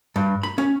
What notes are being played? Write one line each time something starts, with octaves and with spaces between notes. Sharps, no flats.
G2
B5
C#4